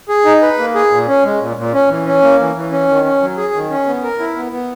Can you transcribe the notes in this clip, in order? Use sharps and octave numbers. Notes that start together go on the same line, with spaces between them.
G#4
D#4
B4
A#3
G#4
A#2
C#4
G#3
A#2
A#2
C#4
E3
C#4
A#3
E3
E3
C#4
D#3
C#4
F#3
G#4
D#3
C#4
B3
A#4
E4
B3
B3